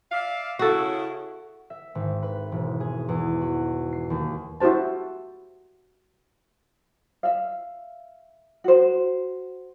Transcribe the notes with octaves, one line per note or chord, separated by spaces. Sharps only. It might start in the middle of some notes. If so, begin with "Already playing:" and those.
D5 E5 F5
C#3 E4 F#4 A4
E5
G#1
B4
E1
G#4
E2
F#4
C7
D#2
E4 F#4 G4 C5 A5
E5 F5
F#4 C5